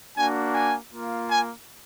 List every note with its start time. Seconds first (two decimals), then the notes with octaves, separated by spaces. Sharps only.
0.16 A#3 D4 F#4 G#5
0.53 G#5
0.91 A#3 F4
1.29 G#5